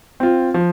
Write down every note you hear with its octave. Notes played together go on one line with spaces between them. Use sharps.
C4 F4
F3